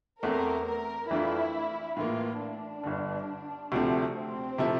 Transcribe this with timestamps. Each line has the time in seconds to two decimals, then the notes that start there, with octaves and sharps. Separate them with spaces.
0.22 E2 E3 A3 C4 A#4
0.66 A#4
1.10 F2 E3 A3 D4 E4 F4
1.97 A2 E3 A#3 F4
2.40 D4
2.83 G1 G2 D3
3.72 D2 C3 F3 A3 C4
4.15 C4
4.58 C3 F3 A3 E4 A4